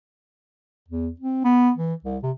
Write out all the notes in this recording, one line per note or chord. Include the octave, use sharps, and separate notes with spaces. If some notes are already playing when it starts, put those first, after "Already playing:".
E2
C4
B3
E3
C2
C3